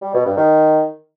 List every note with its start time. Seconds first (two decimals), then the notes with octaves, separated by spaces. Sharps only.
0.02 G3
0.14 B2
0.25 G2
0.37 D#3